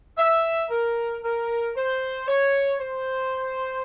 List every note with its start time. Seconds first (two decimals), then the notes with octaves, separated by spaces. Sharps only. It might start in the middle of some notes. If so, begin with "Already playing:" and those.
0.17 E5
0.70 A#4
1.23 A#4
1.75 C5
2.27 C#5
2.79 C5